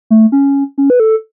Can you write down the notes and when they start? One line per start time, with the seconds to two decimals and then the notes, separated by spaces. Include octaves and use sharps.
0.10 A3
0.32 C#4
0.78 C#4
0.90 B4
1.00 A4